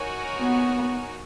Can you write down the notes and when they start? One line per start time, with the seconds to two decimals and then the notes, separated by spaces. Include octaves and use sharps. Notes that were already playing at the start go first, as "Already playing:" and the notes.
Already playing: D#4 F#4 A#4 C#5 G#5
0.38 B3